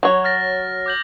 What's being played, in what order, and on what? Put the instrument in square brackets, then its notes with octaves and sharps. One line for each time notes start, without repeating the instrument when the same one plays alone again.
[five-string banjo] F#3 C#5
[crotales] F6 A6 A#6
D6 G6 F#7